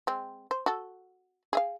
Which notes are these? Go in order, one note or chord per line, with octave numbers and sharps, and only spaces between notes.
G#3 C4
C5
F#4 A4
G#4 E5 F5